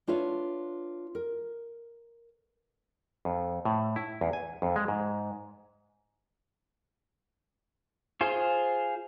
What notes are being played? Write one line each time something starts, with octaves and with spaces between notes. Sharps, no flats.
D4 F4 B4 C#5 E5
A#4
F2
A2
E4
E2
G#5
F2
G#3
G#2
F4 G#4 C5